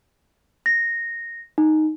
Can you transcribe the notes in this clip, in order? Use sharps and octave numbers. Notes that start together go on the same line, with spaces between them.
A#6
D#4